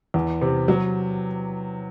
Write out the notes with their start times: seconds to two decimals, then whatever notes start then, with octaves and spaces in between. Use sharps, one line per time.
0.14 E2
0.42 C3
0.68 F#3